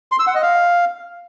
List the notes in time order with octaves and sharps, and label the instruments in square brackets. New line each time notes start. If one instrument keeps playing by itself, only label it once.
[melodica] C6
E6
F#5
D#5
F5